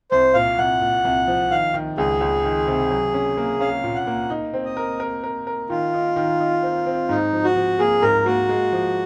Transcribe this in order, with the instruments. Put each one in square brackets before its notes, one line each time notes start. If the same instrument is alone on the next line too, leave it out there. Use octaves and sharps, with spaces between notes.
[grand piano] C2 [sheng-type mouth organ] C5
[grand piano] A#2 [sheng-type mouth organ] F5
[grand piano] C2 [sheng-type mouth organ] F#5
[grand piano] A#2
C2
F3
[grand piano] D#3 [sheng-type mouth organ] F5
[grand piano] D#3
[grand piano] C#2 [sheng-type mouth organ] G#4
[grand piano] C#2
D#3
C3
F#3
C#4
A#3
[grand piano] C#4 [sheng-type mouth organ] F5
[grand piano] A#2
[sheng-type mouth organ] F#5
[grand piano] A#3
D#4
C4
[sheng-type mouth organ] D#5
[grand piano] A#4
A#4
A#4
A#4
[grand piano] D#3 [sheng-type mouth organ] F4
[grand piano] D#4
D#3
D#4
C4
C4
[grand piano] G#2 [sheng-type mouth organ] D#4
[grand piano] F3
[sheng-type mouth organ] F#4
[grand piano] F3
[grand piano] A#3 [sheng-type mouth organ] G#4
[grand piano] G#2 [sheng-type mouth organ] A#4
[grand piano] A#3 [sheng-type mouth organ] F#4
[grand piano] G#3
F3